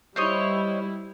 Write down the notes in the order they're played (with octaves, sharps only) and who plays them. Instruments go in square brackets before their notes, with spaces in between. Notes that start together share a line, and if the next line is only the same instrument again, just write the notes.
[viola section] G3 E4 [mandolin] C5 C#5 D#5